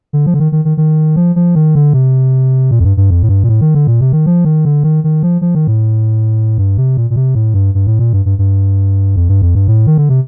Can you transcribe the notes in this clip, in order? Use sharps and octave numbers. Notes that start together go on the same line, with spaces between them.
D3
F3
D3
D#3
D#3
D#3
D#3
F3
F3
D#3
D3
C3
A#2
F2
G2
G2
F2
A2
G2
A#2
A2
D#3
D3
A#2
C3
D#3
F3
D#3
D3
D#3
D#3
F3
F3
D#3
A2
G2
C3
A#2
A#2
C3
A2
G2
G2
A2
A#2
G2
G2
G2
F2
G2
F2
G2
A2
D#3
D3
C3